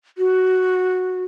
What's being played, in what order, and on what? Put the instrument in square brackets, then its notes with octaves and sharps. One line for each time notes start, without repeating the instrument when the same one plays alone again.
[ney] F#4